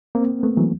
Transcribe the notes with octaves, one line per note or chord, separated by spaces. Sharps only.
A#3 C4
A3 B3
E3 F#3